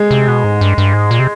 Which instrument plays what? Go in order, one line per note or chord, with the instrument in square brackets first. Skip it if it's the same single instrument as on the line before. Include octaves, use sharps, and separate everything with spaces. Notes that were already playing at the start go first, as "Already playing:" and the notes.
Already playing: [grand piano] G#3
[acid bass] C3
B2
G#2
G2
G2
G#2
A#2
C3